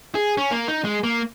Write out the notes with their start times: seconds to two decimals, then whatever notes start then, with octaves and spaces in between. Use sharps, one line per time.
0.15 G#4
0.37 C#4
0.51 A#3
0.68 D#4
0.84 G#3
1.04 A#3